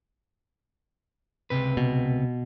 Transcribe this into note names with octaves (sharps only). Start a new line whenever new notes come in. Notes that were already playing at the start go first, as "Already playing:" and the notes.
C#2 C3 B4
B2